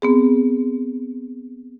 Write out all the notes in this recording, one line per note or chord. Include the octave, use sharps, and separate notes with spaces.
B3 C4 G#4